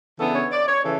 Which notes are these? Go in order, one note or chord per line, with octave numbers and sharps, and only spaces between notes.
C#3 E3 B3 D4 A4
C#5
D5
C#5
C#3 E3 A4